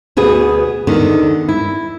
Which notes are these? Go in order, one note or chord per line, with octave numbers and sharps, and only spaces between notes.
D2 B2 G#4 B4
E2 D3 D#3
E4